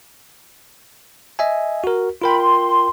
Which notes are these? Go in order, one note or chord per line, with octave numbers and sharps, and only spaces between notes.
D#5 E5 G#5
F#4 A#4
F4 A#4 G5 B5 C6
C6